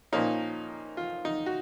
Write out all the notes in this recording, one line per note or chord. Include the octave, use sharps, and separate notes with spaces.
A#2 F3 A#3 C#4 D#4
F4
D#4
F#4